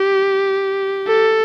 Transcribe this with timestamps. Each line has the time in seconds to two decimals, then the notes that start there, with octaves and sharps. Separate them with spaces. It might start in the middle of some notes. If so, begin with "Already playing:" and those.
Already playing: G4
1.07 A4